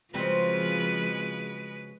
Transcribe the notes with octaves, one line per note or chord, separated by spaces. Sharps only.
C#3 F3 F#3 G#3 C4 B4